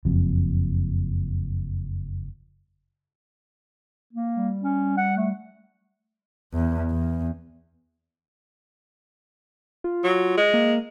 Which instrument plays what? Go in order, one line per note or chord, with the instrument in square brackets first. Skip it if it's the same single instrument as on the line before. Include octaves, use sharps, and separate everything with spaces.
[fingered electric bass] F#1 F2
[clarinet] A#3
[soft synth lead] G3
[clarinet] C#4
F#5
A3
[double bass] E2
E2
[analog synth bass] F4
[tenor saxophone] F#3
G#3
[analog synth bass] A#3